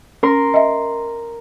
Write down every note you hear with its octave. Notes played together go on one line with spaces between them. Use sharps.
C#4 A#4 C6
D#5 E5